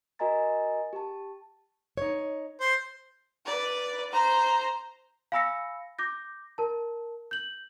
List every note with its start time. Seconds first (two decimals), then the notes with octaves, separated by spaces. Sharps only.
0.19 F#4 A#4 D#5 G#5 A#5 A6
0.93 G4 A5
1.97 D#4 C#5
2.60 C5
3.46 B4 D5
4.12 C5 A#5
5.32 F5 G#5 B5 E6 A#6 C#7
5.99 D6 G6 A#6
6.58 A#4 A5
7.31 G6 F#7